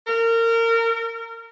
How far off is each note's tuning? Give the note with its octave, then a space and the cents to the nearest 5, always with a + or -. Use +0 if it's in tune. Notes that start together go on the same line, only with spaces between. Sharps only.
A#4 -25